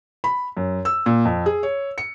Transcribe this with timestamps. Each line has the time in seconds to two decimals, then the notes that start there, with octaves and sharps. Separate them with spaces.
0.24 B5
0.57 F#2
0.85 E6
1.06 A#2
1.25 F2
1.46 G#4
1.63 C#5
1.98 C#7